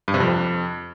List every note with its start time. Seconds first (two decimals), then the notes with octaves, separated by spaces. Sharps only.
0.08 G2
0.14 C3
0.20 F2